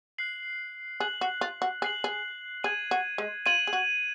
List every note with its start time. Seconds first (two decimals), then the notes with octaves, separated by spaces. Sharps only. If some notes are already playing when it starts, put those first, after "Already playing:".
0.18 F#6 C7 F#7
1.00 G#4 F#6 C7 F#7
1.21 F#4
1.41 F4
1.62 F#4
1.82 G#4 F#6 C7 F#7
2.04 G#4
2.64 G#4 G#6 D#7 F#7
2.91 F#4
3.18 G#3
3.46 F4 G#6 D#7 F#7
3.67 G#4
3.73 F#4